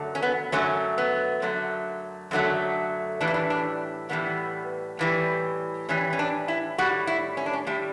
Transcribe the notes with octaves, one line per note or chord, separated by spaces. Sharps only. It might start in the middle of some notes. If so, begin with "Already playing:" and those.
Already playing: F#2 D3 F#3 A3
C#4
B3
F#2 D3 F#3 A3 C#4
B3
F#2 D3 F#3 A3
F#2 D3 F#3 A3
A2 E3 G3 D4
E4
D4
D4
A2 E3 G3 B3
A2 E3 G3
A2 E3 G3 C#4
C#4
D4
E4
A2 G3 F#4
E4
C#4
D4
C#4
A2 G3 E4